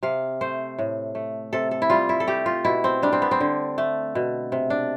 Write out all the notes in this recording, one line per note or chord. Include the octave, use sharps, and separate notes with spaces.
C3 F5
A3 C5
A2
A3
C3 A4
A4
E4
G3 F4
E4
A4
A3 G4
F4
B2 E4
C4
G3 D4
C4
B3
C4
D3
A3
B2
C3
D4